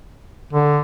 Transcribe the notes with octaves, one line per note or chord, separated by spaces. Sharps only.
D3